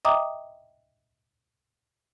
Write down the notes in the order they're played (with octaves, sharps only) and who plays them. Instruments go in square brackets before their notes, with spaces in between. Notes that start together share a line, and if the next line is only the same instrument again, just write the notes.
[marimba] D#5 E5 G5 A#5 D6 D#6